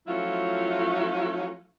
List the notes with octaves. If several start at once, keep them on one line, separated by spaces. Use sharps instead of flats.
F3 F#3 A3 C#4 E4 F4